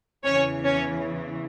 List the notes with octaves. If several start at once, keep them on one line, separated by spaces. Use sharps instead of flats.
E2 C#3 E3 C#4 C#5
C#4 C#5